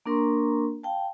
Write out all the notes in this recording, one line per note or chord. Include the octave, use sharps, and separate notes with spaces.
A#3 D4 A#4 A#5 C6 C#6
F5 G5 A5